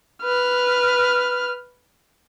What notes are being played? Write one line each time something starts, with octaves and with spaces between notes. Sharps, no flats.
B4 F6